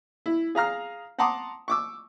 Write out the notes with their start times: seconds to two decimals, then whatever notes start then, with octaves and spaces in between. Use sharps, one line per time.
0.26 E4
0.55 G#4 F5 A#5 F6
1.19 F#5 A5 A#5 C6 D6 D#6
1.68 C#6 D6 E6